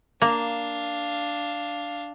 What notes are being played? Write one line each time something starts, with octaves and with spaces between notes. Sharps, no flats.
A#3 D4 F5